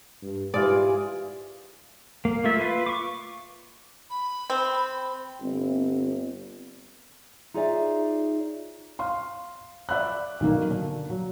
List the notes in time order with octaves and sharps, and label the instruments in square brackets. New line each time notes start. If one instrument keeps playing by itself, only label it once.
[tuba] G2
[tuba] G#2 [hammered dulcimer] E3 F4 G#4 [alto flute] G4 [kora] D5
[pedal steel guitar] A#3
A3 A#3 F4 E5
F4 B4
C#6 D6
[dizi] B5
[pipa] C4
[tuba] G1 [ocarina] C4
[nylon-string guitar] D#4 F4 G#4 C#5 D5 E5
[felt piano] F5 C6
D5 E5 B5 F#6
B1 D#3 A#3
D3 A#3 D4
F#3